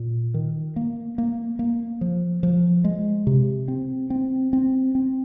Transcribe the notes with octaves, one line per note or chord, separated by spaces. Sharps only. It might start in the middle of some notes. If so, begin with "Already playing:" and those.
Already playing: A#2
D#3
A#3
A#3
A#3
F3
F3
G#3
C3
C4
C4
C4
C4